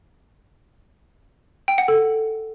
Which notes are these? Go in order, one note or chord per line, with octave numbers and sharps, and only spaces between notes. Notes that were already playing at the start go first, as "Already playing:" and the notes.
G5
F#5
A4